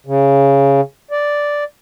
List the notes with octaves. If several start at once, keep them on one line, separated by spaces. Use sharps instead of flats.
C#3
D5